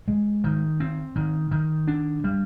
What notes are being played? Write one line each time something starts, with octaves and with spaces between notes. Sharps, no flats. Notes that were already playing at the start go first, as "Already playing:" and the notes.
G#3
D#3
C4
D#3
D#3
D4
G3